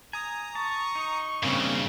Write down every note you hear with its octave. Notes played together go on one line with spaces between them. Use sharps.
G#5 A#5 D#6
A5 C#6
D#4
G2 C#3 A#3 C4 C#4